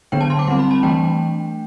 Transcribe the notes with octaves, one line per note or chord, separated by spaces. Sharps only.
D3 F#3 B3 D4 G5
A5
C6
D6
G3 C4 C6
B5
A5
E3 A3 D4 G5